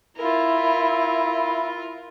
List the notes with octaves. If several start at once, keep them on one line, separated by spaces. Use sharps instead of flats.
E4 F4 A#4